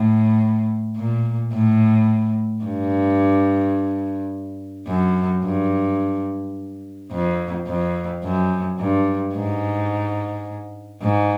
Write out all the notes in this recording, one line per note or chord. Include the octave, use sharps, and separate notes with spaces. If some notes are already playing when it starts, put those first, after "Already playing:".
Already playing: A2
A#2
A2
G2
F#2
G2
F2
F2
F#2
G2
G#2
G#2